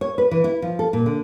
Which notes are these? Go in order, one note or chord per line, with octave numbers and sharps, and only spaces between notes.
C#5
B4
E3
E4
F3
A4
A#2
D3